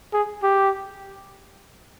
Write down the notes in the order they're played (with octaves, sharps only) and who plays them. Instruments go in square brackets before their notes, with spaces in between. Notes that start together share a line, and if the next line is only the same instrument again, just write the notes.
[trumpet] G#4
G4